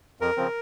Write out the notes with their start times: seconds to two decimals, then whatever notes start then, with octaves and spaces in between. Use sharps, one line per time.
0.20 F2 A#4
0.37 C#3 F3 C4